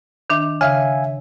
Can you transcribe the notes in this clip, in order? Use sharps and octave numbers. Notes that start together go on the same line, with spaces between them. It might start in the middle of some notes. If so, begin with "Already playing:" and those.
D#3 D4 E5
C#3 E5 F5 G#5